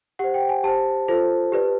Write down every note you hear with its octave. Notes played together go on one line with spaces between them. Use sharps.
G4 C5 F#5
G5
G#5
G4 C5 A5
F4 A4 C5
G4 B4 D5